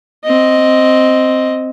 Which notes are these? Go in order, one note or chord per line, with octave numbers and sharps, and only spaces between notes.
C4 D#5